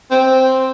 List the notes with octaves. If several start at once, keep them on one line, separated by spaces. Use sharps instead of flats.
C4